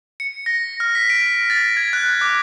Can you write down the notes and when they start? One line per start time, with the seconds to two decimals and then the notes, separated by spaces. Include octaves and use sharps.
0.20 C#7
0.46 A#6
0.80 F6
0.95 B6
1.10 D7
1.50 A6
1.77 G#6
1.93 F#6
2.21 D6